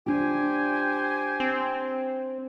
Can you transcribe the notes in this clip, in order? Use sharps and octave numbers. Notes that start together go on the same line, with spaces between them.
D4 F4 G4 C5 G#5
C4